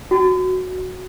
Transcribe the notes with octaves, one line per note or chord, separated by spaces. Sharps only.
F#4